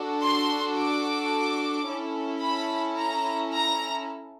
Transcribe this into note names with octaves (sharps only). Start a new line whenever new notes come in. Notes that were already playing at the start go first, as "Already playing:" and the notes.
Already playing: D4 F#4 A4
C6
D6
C#4 E4 A4
B5
A#5
A#5